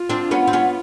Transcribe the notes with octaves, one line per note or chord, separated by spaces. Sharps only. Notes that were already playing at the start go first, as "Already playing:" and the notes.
Already playing: F4
C4 D4
B3 C#4
C4
B3 C#4